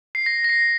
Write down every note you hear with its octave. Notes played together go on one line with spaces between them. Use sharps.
C7
A#6
A#6
C7